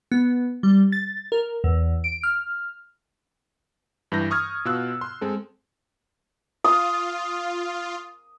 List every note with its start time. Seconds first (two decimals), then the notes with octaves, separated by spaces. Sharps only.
0.12 B3
0.63 G3
0.92 A6
1.32 A#4
1.64 E2
2.04 D7
2.23 F6
4.12 G2 E3 G6 A#6
4.31 C#6 D#6 F6 G#6
4.65 B2 F4 E6 F#6
5.01 C6
5.21 G#3 C4 A4
6.64 F4 D#6